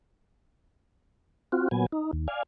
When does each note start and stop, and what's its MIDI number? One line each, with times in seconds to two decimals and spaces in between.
1.52 1.68 60
1.52 1.68 65
1.52 1.68 66
1.71 1.86 46
1.71 1.86 54
1.71 1.86 59
1.71 1.86 80
1.92 2.11 63
2.13 2.28 39
2.28 2.43 74
2.28 2.43 77
2.28 2.43 80